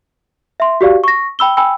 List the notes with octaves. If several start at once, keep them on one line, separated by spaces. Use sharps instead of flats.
E5 C6
F#4 G4 D5 F5
C#6 A#6
G5 B5 E6 G7
G5 G#5 B5 E6